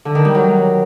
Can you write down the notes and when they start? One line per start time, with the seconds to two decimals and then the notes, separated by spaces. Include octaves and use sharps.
0.05 D3
0.15 D#3
0.25 G3
0.35 F#3